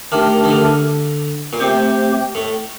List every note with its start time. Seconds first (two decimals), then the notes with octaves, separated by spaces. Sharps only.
0.12 D#3 A3 D4 G4 A#4
0.44 D#3
0.49 D3
1.53 A#2
1.60 C3 A3 C4 G4 C5
2.35 A2